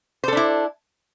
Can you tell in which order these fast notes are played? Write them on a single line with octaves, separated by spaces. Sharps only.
C5 A4 D4 E4